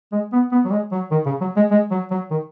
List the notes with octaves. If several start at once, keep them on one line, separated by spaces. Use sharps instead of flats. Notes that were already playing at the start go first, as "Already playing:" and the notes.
G#3
B3
B3
F#3
G#3
F#3
D#3
C#3
F#3
G#3
G#3
F#3
F#3
D#3